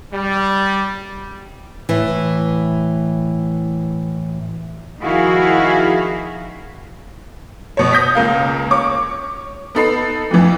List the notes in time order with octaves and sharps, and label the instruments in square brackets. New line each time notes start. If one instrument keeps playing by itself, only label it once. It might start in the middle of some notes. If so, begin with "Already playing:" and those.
[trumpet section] G3
[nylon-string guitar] A2 E3
[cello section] D#3 F3 E4 F#4 G#4 F5
[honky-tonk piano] B2 C#5
D#6 G6 A#6 B6
C#2 A#3 F5
C#5 C#6 D6
B3 D#4 A4 B5 C7
F2 E3